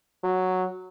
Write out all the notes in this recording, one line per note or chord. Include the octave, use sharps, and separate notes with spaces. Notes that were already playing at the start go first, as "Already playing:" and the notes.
F#3